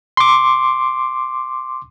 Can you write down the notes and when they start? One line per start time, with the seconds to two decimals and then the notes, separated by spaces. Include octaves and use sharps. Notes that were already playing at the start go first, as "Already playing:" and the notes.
0.17 C6 D6